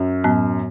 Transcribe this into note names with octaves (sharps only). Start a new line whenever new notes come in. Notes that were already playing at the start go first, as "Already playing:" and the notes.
Already playing: F#2
A2 F#3 B3